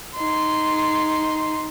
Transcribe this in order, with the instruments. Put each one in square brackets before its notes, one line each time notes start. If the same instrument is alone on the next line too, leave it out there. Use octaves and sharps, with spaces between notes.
[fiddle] D#4 C6